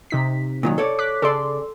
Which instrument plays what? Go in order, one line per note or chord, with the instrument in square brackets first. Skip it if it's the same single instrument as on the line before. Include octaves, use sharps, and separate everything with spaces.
[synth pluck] C3 D#4 B6
[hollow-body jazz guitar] A#2 D#3 F#3
A4 C#5 D5
[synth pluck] D6 F#6 B6
[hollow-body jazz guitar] C#3 D5 [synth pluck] A4 C6